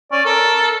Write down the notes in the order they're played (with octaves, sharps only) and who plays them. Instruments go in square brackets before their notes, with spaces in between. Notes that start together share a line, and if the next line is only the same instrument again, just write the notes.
[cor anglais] C#4 [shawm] D5
[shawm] A4 [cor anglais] A#4